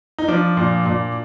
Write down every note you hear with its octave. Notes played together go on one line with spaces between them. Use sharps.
D#4
F3 D4
A#2
A#2